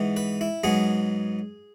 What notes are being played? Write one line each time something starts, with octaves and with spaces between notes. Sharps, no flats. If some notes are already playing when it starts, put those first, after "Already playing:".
Already playing: G#2 E3 B3
B4
E4
G#2 F#3 B3 G#4